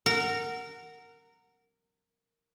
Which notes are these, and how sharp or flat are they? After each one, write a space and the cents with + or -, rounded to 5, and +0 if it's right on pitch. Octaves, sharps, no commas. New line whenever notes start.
A#4 -15 F#5 +0